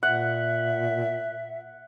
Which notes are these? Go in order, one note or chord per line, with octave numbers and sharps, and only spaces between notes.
A#2 E5 F#5